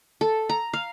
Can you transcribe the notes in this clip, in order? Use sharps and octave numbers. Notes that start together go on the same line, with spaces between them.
A4
A#5
F5